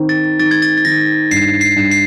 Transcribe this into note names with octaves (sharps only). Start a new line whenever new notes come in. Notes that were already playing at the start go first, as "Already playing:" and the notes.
Already playing: D#3 C4
A6
D#3 A6
G#6
A6
A6
D#3 A#6
G2 C7
C7
G2
C7